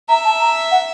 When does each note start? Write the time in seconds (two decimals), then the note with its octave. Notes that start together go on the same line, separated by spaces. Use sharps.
0.09 E5 A#5
0.25 A5
0.40 A#5
0.71 F#5